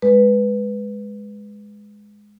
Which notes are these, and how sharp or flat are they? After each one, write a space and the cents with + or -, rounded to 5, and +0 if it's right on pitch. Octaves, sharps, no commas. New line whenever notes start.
G#3 +0 B4 +0